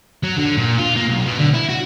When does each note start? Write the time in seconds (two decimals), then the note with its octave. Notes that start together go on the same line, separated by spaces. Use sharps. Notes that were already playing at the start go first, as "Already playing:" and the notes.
0.24 F#3
0.38 D3
0.58 A#2
0.79 F4
0.97 A#3
1.09 B1
1.26 B2
1.39 D3
1.54 E4
1.69 F#4